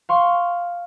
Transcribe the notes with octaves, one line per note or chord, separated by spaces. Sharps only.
F5 C6 C#6